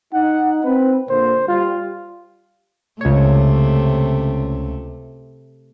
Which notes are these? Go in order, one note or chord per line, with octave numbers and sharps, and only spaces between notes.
D#4 F#5
C4 B4
A#2 D3 A#3 C5
G3 F4
C#2 C3 A3 C#5